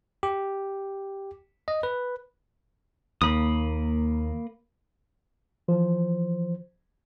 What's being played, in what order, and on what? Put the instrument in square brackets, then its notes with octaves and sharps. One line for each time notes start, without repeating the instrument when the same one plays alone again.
[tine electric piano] G4
D#5
B4
[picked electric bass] D#2 [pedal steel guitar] A#3 B5 D#6
[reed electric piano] E3 F3 C5